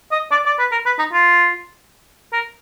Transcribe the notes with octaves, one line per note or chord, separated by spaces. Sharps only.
D#5
D5
D5
B4
A#4
B4
D#4
F4
A#4